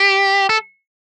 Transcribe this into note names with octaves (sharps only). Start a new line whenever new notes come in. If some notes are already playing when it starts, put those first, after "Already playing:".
Already playing: G4
A4